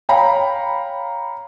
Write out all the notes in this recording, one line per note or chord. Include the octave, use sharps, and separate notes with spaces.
C#5 F5 G5 A#5 B5